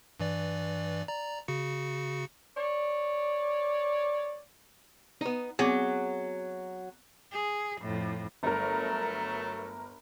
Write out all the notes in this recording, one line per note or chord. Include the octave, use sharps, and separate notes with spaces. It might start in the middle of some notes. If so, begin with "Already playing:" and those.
G2 E3 D5
D5 A#5
C#3 F#4 C#7
C#5 D5
B3 D#4
F#3 B3 C4 G#4 D6
G#4
F2 A2
G1 F#3 A3 A#4